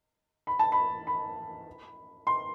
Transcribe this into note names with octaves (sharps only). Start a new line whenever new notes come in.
B5
A5
B5
B5
C6